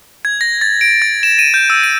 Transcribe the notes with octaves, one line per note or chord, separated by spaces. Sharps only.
G#6
A#6
A6
D7
A6
E7
D#7
G6
E6
D#7